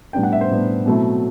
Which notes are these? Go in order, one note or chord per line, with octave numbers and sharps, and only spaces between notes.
A2 G3 B3 D4 G5
F#5
E5
C5
A2 G3 B3 D4
B2 F#3 A3 C4 E4